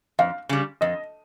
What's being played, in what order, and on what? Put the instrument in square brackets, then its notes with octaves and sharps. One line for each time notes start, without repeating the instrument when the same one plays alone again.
[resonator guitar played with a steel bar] F2 [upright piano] F5
[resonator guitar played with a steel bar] C#3 G3
[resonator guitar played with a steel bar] F2 [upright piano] D#5